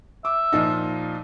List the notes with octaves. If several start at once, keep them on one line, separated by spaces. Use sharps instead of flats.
E5 D6
A#2 F3 D#4